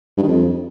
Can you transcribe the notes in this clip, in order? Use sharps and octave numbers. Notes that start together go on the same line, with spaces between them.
G2
D#3
F2